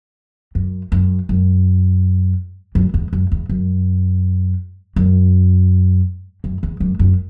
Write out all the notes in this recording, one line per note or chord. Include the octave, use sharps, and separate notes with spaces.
F#2
F#2
F#2
F#2
E2
F#2
E2
F#2
F#2
F#2
E2
F#2
F#2